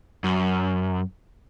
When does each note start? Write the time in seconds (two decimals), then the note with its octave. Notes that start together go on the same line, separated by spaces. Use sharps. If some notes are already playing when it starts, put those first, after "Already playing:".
0.24 F#2